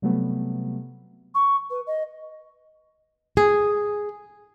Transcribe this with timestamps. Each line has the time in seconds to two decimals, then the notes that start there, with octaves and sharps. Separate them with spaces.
0.02 C3 F#3 G3 A3 B3
1.35 C#6
1.70 B4
1.87 D#5
3.37 G#4